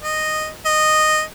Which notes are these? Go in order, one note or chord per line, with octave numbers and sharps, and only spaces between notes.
D#5
D#5